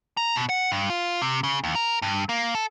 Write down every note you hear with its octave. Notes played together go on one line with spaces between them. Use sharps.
A#5
B2
F#5
G2
F4
C3
C#3
D#2
A#4
G2
A#3
A4